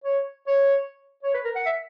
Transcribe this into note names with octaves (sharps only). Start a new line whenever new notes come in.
C#5
C#5
C#5
B4
A#4
F#5
E5